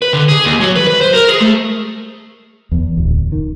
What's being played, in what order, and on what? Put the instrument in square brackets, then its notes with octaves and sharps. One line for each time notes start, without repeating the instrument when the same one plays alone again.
[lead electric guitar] B4
D3
G#4
D#2
F#3
B4
B4
C5
A#4
G#4
A3
[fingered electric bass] E2
D1
D#3